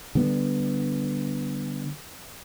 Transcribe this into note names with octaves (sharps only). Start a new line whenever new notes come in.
D3 G3 B3